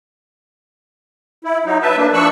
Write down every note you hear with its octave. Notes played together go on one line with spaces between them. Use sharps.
E4
F#3 D#4
B4 E5 A5
A#3 D4
F3 D4 C#6 E6 F#6